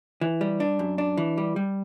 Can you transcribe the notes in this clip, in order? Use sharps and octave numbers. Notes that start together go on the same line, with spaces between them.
E3
G3
D4
F#2
D4
E3
G3
G3